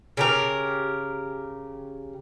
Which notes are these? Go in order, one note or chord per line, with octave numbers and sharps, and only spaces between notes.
C#3 G4 A#4